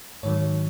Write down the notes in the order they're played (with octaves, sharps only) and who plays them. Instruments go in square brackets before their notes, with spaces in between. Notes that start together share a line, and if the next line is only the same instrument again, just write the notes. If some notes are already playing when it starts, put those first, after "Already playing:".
[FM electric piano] G#2 D#3 F#3 C#5